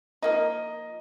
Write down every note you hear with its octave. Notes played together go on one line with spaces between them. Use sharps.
F3 A#3 D#4 D#5